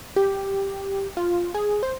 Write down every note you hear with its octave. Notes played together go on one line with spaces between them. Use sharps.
G4
F4
G#4
C5